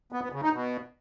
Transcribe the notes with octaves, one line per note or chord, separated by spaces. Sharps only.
B3
B3
C#3
D#4
B2